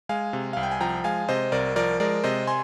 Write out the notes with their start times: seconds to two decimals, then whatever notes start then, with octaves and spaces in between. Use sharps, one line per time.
0.09 G#3 F5 G#5
0.33 C3
0.53 C2 F5
0.63 G5
0.71 G#5
0.81 F3 G5 A#5
1.04 G#3 F5 G#5
1.29 C3 C5 D#5
1.52 C2 A#4 D5
1.76 F3 A#4 D5
2.00 G#3 A#4 D5
2.24 C3 C5 D#5
2.47 G#5 C6